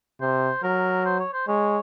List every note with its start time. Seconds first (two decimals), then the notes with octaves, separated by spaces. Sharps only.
0.21 C3 C5
0.63 F#3 A#4
1.05 C5
1.19 C#5
1.33 C5
1.48 G#3 C#5